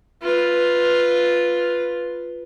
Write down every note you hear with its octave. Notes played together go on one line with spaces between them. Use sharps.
F4 B4